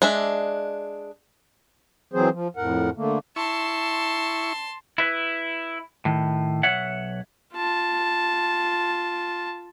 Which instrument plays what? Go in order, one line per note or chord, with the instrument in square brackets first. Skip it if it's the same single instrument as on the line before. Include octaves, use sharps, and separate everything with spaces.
[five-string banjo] G#3 D4 E5
[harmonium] E3 F#3 C4 G#4 C5
F3
F2 A2 A#4 F#5
D3 A3 A#3
[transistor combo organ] E4 C#6 [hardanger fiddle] A5 C6
[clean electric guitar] E4 B4
A2 D#3
B1 C#5 E5 F#5
[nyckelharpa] F4 A5